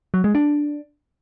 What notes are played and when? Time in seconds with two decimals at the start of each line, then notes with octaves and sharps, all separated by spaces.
0.14 F#3
0.24 G#3
0.35 D4